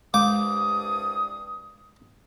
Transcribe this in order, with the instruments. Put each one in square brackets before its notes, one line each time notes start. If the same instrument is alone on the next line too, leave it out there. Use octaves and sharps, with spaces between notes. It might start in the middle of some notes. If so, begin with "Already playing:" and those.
[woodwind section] C2 G2 D#6 [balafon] G#3 [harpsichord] D6